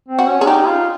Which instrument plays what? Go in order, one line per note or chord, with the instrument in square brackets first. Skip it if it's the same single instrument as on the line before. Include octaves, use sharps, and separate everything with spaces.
[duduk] C4
[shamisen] F#4
[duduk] C#4
[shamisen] G#4
[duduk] D#4 [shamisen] G4
[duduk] F4